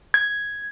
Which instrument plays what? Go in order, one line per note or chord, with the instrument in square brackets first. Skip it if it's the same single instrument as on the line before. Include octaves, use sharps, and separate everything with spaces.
[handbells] G#6